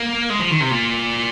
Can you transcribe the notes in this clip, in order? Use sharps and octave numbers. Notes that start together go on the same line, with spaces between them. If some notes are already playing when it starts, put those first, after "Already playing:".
Already playing: A#3
G#3
F3
D#3
C3
A#2